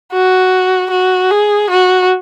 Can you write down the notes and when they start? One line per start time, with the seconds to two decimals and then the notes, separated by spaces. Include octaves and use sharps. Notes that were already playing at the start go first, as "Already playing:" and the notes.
0.12 F#4
0.91 F#4
1.30 G#4
1.70 F#4